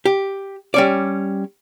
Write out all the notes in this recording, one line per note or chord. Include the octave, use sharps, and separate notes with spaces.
G4
G3 C#4 D5